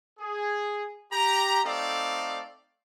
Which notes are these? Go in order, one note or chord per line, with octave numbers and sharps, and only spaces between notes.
G#4
G4 A#5
A3 C4 D#4 A4 D5 F5